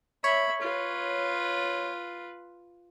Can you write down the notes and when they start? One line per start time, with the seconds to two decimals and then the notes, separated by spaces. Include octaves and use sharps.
0.24 C#5 E5 B5
0.62 F4 B4